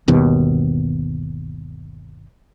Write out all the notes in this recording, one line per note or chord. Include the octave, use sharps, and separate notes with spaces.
G1 D#2 B2